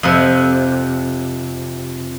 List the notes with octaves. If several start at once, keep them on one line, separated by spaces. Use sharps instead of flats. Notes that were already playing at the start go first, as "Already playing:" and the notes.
F2 C3